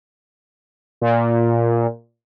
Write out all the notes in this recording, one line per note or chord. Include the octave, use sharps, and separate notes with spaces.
A#2